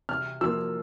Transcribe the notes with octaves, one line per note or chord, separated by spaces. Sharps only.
C3 F6
F3 A#3 E6